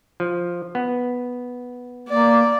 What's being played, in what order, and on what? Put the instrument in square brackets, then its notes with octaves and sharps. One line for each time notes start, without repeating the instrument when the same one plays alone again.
[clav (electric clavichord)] F3
B3
[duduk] A#3 [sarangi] D5